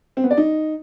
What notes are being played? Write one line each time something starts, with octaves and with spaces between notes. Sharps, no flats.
C4
B3
D5
D#4